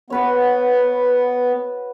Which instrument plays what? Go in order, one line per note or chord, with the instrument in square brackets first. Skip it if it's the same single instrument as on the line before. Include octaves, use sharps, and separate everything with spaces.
[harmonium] B3 [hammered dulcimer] F#4 B4 C#5